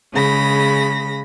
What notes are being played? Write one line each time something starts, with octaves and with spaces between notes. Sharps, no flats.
C#3 G#3 B5 A#6